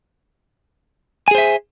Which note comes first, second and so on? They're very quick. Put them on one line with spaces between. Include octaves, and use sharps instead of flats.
G#5 G#4 C5 E5